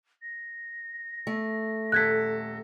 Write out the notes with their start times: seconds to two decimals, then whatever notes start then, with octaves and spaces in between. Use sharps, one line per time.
0.22 A#6
1.27 A3
1.92 D#1 A4 F#6 G#6 B6